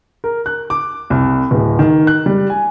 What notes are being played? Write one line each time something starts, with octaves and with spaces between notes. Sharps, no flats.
A#4
F#6
D6
C2
D1
D#3
F#6
G3
G#5